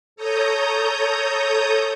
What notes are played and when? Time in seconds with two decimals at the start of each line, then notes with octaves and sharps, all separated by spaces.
0.16 A4 C#5 A#5 D#6 G6